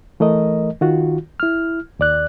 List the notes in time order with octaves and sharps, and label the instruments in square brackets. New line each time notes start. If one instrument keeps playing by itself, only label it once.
[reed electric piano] E3 A3 A#4 D#5
D#3 F4 F#4
E4 F6
D#2 D5 F#6